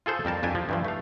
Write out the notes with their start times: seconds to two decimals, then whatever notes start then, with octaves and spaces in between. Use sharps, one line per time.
0.06 F4 G#4 A4 C5
0.25 F2 G3 A#4 A5
0.43 F2 D4 G4 G#5
0.55 F3
0.69 G2 E3 F3
0.85 A3 F5